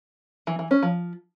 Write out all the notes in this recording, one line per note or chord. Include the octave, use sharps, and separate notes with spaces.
E3
E3
C#4
F3